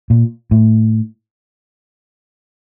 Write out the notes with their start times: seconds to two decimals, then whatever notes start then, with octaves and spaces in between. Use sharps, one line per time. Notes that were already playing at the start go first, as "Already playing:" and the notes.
0.10 A#2
0.51 A2